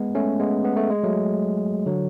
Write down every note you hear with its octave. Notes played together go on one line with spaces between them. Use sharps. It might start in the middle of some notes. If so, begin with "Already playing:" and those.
Already playing: G#3 B3
A3 C#4
G#3 B3
B3
A3
G#3
F#3 A3
D3 F#3